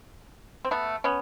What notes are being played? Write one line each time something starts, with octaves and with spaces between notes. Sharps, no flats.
C4
A3 B3
B3 C#4